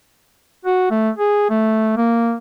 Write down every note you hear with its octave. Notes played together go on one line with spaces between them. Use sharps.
F#4
A3
G#4
A3
A#3